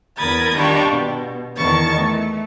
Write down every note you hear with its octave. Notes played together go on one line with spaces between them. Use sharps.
E2 A#4 B5 D#6 G#6 A6
D#3 G3 D4 F4 G5 C#6
B2
E2 D#3 E3 A5 C#6 A6
A3